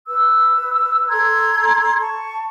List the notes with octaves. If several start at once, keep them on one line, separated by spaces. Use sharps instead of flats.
B4 E6
A4 A#5 C6 G#6
A5 C#6